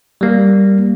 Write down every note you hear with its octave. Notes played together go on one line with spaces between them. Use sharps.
G3 A#3